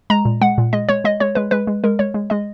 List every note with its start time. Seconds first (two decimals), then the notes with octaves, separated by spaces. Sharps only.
0.10 G#3 A#5
0.25 A#2
0.41 G#3 F#5
0.58 A#2
0.73 G#3 D#5
0.89 G#3 C#5
1.04 G#3 D#5
1.20 G#3 C#5
1.35 G#3 B4
1.51 G#3 B4
1.67 G#3
1.84 G#3 A#4
1.99 G#3 C#5
2.14 G#3
2.30 G#3 D#5